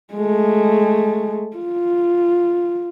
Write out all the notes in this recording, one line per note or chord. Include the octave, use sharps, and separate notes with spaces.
G#3 A3
F4